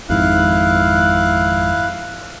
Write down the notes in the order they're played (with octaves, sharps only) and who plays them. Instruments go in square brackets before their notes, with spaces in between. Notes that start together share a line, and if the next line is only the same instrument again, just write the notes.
[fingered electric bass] G#1 F2 G#2 [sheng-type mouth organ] E4 F5 F#6